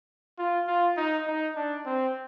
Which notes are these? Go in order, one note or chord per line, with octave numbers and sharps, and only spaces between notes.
F4
F4
D#4
D#4
D4
C4